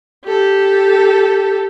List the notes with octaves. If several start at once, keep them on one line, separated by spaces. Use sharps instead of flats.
G4 A4